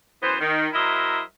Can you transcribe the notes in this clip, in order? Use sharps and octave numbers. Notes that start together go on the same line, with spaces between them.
F#2 E3 B3 C5
D#3
F#3 E4 A#4 C5 D#5 E5